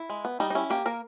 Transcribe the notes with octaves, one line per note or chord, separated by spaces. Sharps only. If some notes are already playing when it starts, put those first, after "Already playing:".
Already playing: E4
G#3
B3
G3 D#4
D#4
C#4 E4
A#3 G4
A#3 A#4